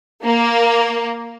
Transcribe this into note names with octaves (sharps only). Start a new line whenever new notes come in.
A#3